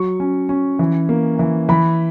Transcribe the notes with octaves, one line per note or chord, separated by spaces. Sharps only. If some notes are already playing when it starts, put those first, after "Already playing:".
Already playing: F#3 C#6
C#4
C#4
E3
A#3
E3
E3 B5